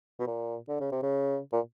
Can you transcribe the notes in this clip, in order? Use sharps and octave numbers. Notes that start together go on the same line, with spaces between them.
B2
A#2
D3
C#3
C3
C#3
A#2